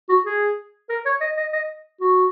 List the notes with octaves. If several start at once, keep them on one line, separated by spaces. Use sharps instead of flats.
F#4
G#4
A#4
C#5
D#5
D#5
D#5
F#4